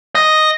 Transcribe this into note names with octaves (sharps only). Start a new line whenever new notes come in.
D#5